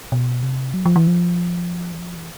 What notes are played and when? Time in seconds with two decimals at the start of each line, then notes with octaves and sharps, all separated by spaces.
0.12 B2
0.43 C3
0.74 F#3
0.85 F3
0.96 E3
1.07 F3
1.93 E3
1.99 F3
2.15 E3